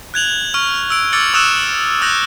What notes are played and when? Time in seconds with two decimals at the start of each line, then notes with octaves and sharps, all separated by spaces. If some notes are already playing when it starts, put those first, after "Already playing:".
0.14 F#6 G#6 F7 F#7
0.54 C#6 F6
0.90 E6 D7
1.12 D6 E6 F6 A6 C#7 F#7
1.34 C#6 D#6 E6 F#6 E7
2.01 D#6 E6 F#6 G6 A#6